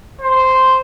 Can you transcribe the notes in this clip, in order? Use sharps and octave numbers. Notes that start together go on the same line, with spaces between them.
C5